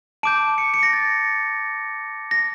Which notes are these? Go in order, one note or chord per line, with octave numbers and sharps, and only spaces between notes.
A5 D6 G6 D7
C#7
C#7
A#6
A6
A#6